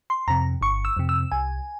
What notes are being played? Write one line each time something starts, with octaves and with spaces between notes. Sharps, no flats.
C6
F2 C3 A#5
G1 C#6
E6
F2 C3
E6
C2 G#5